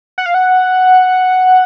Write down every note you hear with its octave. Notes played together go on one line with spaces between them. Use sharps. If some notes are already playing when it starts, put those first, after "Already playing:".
F#5
F5
F#5